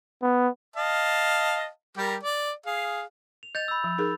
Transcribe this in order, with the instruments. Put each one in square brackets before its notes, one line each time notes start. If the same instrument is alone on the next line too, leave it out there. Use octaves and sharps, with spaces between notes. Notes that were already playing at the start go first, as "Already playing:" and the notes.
[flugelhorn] B3
[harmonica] D#5 F5 A5
G3 G4 A#4
D5
G#4 F5
[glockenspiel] F7
[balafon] D#5 [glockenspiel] G6 A6 F7
[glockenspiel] B5 E6
[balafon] F3
D#4 G#4 A#4